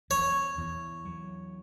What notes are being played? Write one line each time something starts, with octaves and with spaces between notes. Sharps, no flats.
E2 C#5
E2
F#3